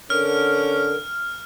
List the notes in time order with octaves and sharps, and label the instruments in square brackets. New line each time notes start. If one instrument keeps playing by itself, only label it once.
[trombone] D3 [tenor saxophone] C#4 [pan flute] A#4 [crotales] F6